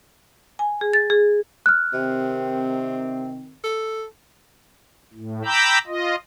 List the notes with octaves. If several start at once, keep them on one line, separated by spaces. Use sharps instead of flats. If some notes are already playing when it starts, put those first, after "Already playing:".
G#5
G#4
A6
G#4
F6 F#6
C3 D#3 C4
A4
A2
G5 A#5 B5 D6 E6 G6
F4 D#5